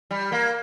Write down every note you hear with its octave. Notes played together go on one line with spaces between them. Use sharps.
G3
A#3